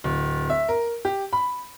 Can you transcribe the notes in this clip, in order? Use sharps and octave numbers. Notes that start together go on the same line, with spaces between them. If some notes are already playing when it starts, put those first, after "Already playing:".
D1
E5
A#4
G4
B5